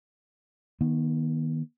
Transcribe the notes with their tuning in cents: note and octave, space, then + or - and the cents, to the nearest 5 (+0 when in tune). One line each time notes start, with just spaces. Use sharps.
D#3 +0 B3 -40